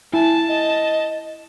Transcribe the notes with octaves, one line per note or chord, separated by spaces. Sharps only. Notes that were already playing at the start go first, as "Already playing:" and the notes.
E4 G#5 A5
D#5